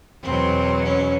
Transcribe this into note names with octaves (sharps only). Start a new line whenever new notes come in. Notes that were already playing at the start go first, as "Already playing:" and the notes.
E2 B2 F#3 C4
C#4